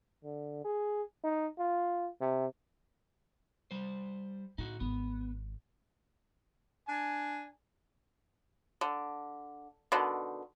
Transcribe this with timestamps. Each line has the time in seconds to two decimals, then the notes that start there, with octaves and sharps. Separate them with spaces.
0.24 D3
0.65 G#4
1.24 D#4
1.59 F4
2.21 C3
3.71 G3 C5
4.58 A2 D3 D#4 F#4
4.80 G#1 D#3 B3
6.88 D4 G#5
8.81 D3
9.92 B2 D3 D#3